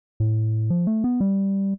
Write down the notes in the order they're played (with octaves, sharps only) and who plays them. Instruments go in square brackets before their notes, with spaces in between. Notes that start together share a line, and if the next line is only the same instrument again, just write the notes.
[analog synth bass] A2
F3
A3
B3
G3